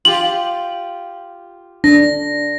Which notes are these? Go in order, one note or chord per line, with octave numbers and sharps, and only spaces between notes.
F4 G4 F#7
D4 A#6